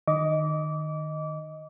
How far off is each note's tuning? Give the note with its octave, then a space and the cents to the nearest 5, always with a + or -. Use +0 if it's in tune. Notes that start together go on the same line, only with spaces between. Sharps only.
D#3 -25 D#5 +5 D6 -25